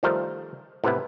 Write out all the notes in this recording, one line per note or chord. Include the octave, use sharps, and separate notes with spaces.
D#3 F3 G3 A3 A#4 C5
A2 C3 B3 E4